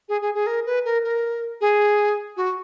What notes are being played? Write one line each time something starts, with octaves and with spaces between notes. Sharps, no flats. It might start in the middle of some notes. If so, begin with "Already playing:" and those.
G#4
G#4
G#4
A#4
B4
A#4
A#4
G#4
F#4